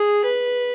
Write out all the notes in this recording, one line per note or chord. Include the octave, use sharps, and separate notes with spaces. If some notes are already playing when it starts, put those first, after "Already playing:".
Already playing: G#4
B4